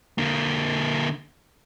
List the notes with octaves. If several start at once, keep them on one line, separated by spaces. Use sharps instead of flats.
D3 A#3